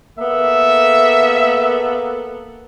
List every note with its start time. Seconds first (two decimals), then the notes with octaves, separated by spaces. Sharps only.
0.19 A#3 B3 A4 E5